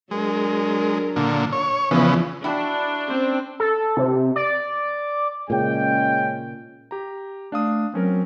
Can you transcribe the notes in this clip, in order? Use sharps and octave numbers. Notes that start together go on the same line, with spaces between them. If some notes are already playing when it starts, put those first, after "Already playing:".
F#3 G#3 D4 A#4
A#2 D3
C#5
E2 C#3 E3 F3 B3
D4 E4 F#4 G5 A5
C4 C#4
A4
C3
D5
A#2 C#3 G#3 C#4 G5
G4 A#5
A3 D4 F5 D#6
F#3 C4 C#4 A#4